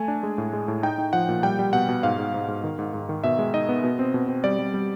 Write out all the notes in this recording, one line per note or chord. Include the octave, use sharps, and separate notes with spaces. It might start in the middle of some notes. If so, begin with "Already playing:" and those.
Already playing: A3 G#5
D4
G#3
A2
G#3
A2
D#4 G5
D#4
F3 F#5
A#2
G3 G5
G3
B2 F#5
B2
G#2 F5
G#2
G#2
G#2
D#3
G#2
G#2
D#3
B2 E5
G#3
D#4 D#5
B3
B2
C4
B2
C4
G3 D5
G3
G3